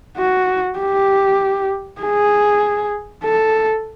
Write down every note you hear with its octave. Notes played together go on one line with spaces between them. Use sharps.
F#4
G4
G#4
A4